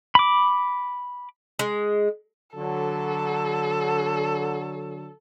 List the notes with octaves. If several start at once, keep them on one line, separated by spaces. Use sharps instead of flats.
B5 D6
G#3
D3 F#3 A4